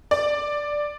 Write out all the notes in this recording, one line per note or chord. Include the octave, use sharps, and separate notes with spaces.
D5